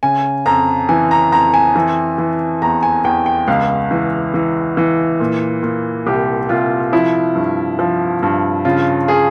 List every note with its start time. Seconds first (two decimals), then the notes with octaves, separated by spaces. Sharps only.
0.03 C#3 G#5
0.46 F2 A#5
0.89 E3 G#5
1.11 A#5
1.32 F2 A#5
1.54 G#5
1.76 E3
2.18 E3
2.62 E2 A#5
2.83 G#5
3.04 E2 G5
3.26 G5
3.48 C#2 F5
3.91 E3
4.34 E3
4.77 E3
5.20 A#2
5.63 A#2
6.06 C2 G4
6.49 C2 F4
6.92 F3 E4
7.35 G2
7.79 F3
8.23 G2
8.65 C#3 F4
9.08 G#4